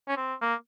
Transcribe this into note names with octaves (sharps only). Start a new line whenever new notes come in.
C#4
C4
A#3